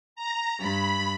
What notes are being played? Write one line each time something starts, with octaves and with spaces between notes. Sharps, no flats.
A#5
G2 B5